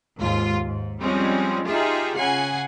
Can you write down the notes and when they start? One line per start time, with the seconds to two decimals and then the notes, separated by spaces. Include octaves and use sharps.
0.18 D#2 G#2 F4
0.64 G#2
1.02 F3 G3 G#3 C4 C#4
1.68 D#4 F4 G4 G#4 E5
2.17 C#3 F#5 G#5 C7